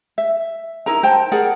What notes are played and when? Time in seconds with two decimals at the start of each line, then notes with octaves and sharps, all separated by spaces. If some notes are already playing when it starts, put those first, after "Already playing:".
0.18 E5
0.86 D#4 E4 A#4 A#5
1.03 C5 G5 A5
1.32 G#4 A#4 D5 F#5